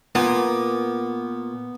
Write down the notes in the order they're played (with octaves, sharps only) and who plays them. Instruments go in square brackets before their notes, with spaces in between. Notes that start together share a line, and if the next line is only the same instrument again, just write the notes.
[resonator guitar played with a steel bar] A#2 [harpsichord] B3